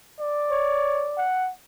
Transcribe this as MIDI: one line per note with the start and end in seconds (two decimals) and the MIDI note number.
0.20 1.25 74
0.51 1.09 73
1.17 1.51 78